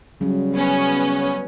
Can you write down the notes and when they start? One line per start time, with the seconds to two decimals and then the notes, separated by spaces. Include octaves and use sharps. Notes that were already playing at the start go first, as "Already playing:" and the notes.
0.21 C#3 F#3 G3
0.54 B3 C#4